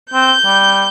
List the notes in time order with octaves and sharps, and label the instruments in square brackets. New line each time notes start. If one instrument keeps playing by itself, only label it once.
[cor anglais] C4 [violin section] G6
[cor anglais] G3